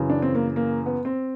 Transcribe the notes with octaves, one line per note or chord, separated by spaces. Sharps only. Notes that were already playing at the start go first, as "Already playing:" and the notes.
Already playing: F#2 C#3 E3
D4
C4
A#3
A#3
B3
C4